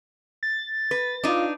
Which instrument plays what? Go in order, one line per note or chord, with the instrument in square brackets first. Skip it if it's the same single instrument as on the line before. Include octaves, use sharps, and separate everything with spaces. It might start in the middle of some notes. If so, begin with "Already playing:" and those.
[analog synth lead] A6
[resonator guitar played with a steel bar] B4
[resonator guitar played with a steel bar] D4 D#4 [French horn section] F4